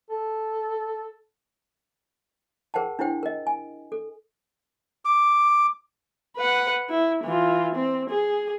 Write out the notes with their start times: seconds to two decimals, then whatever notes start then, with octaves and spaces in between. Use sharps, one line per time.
0.10 A4
2.74 G#4 A#4 C5 F#5 G5 A5
2.99 D4 E4 G4 C5 G5
3.23 A#4 D#5
3.47 G#5
3.92 A4
5.05 D6
6.37 B4 F#5
6.90 E4
7.24 E3 F4
7.75 C4
8.09 G#4